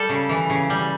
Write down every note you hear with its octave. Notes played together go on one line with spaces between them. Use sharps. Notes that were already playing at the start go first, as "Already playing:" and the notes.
Already playing: G3 A4
C#3
E3
C#3
G3